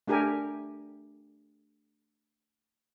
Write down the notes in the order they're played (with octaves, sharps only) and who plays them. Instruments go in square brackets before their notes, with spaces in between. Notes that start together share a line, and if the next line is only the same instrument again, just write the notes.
[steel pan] A3 D4 G4 A#4 G#5